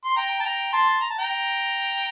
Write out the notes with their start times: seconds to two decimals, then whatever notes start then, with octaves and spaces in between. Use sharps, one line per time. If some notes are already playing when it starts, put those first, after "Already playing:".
0.05 C6
0.16 G5 A#5
0.40 A5
0.44 G5 A#5
0.73 A5 C6
1.01 A#5
1.10 A5
1.18 G5 A#5